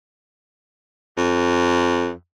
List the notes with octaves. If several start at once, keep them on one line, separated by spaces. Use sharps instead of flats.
F2